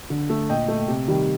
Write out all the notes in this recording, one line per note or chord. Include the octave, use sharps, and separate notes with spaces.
D3
A3
A#2 D#5 G5
A3
C3
D#3 G3